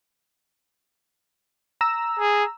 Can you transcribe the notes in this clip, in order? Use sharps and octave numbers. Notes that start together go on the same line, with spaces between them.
A#5 E6
G#4